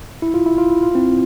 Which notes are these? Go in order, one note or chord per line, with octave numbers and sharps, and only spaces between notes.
E4
F4
E4
F4
E4
F4
C4 E4